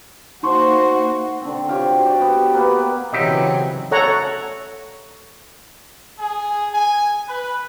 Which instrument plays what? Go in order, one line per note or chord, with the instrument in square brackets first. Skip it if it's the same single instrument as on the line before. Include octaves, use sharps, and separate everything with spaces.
[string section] A#3 F#4 C5 [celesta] D#4 C6 C#6
[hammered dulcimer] D3 C4
F4 G4 C#5
F#4 C5
F#4 G4 C5 D5
B3
A#3 B3 G4 B4
[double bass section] C#3 E3 [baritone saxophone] F#3 [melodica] C4 [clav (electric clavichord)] D#4 G4 E5
[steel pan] A4 C#5 F#5 A#5
[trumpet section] G#4
G#5
B4